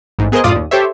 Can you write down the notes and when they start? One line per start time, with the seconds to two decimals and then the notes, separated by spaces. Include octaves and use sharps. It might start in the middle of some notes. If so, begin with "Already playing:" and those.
0.19 A1 G#2
0.32 B3 G#4 A#4 C5 D#5
0.44 F#2 A2 F4 D5 D#6
0.56 D#2
0.71 G4 A4 C5 C#5 E5